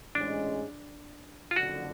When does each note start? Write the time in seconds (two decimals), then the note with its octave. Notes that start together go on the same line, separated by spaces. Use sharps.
0.15 A1 G#2 G#3 C#4 D4
1.51 F4
1.56 F#1 F2 D3 F#4